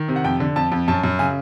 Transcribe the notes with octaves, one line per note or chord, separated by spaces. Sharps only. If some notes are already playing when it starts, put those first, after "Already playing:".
Already playing: D#3
C3
F#5
F2 G5
D3
F2 A5
F2
F#2 A5
F#2
C#3 G#5